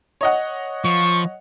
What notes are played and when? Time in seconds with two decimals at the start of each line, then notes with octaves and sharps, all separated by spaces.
0.21 C#5 D#5 F#5
0.85 F3 C#6